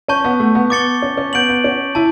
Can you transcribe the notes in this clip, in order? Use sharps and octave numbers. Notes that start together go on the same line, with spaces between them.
C#4 A5 C#6 G6
B3
A3
B3
B3 D6 A6 C#7 G7
C#4
C#4
B3 G6 D7 F#7
B3
C#4
E4 A5